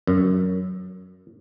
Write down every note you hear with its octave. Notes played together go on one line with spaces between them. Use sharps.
F#2